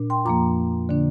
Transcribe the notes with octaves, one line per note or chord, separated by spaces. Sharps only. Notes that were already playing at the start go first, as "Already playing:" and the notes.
Already playing: A#2 D4
G5 C6
F2 F3 A#3 A#5 D6
D3 A#3 D4